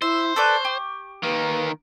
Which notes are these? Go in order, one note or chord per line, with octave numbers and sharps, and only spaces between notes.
E4 C5 E5
A4 B4 D5 C#6
G4
D#3 A#3 B4